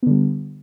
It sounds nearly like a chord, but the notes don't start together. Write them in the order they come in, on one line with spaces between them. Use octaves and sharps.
B3 D3 G3